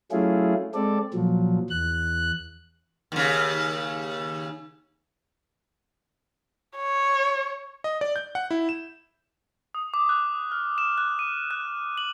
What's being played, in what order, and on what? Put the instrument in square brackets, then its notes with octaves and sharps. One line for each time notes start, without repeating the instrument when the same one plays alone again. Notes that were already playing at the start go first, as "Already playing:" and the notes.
[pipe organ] F#3 A3 C#4 E4 F4 G#4
G#3 C4 A4 D5
A#2 F3 F#3
E2 F#6
[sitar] D#2 C#3
[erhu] C#5
[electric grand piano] D#5
D5
G6
F#5
E4
E7
[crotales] D#6
D6
F#6
F6
E7
F#6
D#7
F#6
F#7